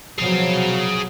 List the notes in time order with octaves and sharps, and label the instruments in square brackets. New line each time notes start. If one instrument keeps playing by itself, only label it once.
[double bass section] B2 F3 F#3 [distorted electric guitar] G#4 F5